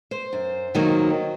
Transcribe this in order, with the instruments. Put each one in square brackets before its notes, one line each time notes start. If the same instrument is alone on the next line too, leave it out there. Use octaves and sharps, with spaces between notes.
[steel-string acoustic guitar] C5
F#2
D#3 F#3 A#3